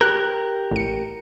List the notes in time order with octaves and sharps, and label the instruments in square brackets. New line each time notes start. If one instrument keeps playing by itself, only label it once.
[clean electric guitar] G4 A#4 [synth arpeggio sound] F#6
[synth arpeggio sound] A1 C#7